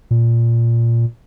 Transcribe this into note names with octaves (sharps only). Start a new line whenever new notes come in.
A#2